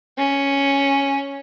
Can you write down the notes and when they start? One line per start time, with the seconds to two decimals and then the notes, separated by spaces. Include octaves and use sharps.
0.18 C#4